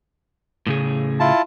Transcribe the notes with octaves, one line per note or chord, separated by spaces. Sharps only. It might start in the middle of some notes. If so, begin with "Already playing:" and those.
A2 C#3 G#4
E4 F4 A5